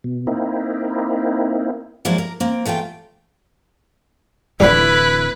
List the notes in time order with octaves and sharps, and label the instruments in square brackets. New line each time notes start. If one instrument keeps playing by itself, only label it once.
[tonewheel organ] B2
A#3 C4 D#4 E4
[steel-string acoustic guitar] F3 F#3 G#3 A#3 E4 D5
A#4
A#3 C4
E2 A3 F4 F5 G5
[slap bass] D1 D2 E3 [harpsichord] F3 G3 [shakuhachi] E4 [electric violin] B4